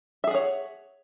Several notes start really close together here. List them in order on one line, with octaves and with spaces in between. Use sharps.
E5 G#4 F#5 C#5